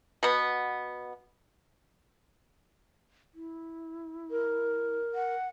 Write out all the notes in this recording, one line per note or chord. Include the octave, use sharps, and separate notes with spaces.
B2 B3
E4
A#4
F#5